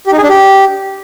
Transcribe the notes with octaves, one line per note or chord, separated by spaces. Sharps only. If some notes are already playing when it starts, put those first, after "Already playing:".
G4
D#4
G#4
D4
G4